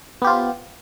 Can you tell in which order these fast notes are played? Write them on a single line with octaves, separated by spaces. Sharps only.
B3 G4 F4 C5